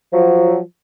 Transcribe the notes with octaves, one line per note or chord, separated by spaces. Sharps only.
F3 F#3